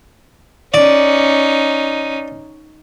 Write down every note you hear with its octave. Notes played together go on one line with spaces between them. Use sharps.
C#4 D#4 D5